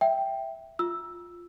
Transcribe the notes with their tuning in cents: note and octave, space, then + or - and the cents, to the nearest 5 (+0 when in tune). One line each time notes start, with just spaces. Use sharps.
E5 +0 G5 +0
F4 +0 E6 +0